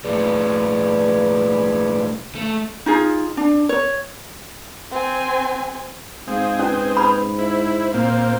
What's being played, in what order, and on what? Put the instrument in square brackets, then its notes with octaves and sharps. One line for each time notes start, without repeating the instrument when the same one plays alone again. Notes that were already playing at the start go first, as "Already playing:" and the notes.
[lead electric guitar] B1 A2 [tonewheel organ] G#4 B4 D5
[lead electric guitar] A3
[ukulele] D#4 F4 G#4
D4
C#5
[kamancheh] C4 G#5
[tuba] G#2 [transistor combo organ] C4 G#4 [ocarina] F5
[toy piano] C#4 [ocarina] B4
[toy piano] B5
[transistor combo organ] E4 [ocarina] C5
[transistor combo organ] A#2 A#3 C4